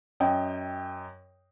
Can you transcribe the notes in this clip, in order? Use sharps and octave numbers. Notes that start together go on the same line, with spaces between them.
F#2 D#5 G5